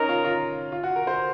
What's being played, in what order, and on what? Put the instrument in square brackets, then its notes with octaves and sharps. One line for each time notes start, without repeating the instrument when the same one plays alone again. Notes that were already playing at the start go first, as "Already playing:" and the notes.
Already playing: [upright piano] C#4 D#4 [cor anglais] A#4
[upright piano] F4
F4
F4
F#4
A#4
C5